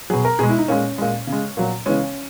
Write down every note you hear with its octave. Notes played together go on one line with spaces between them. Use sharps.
B2 F#3 G#4
A#4
B2 G#3 G#4
E4
D#4
A#2 G#3 C#4
A#2 G#3
C#3
G#3
A#2 F#3
C#3 E3 G#3 C#4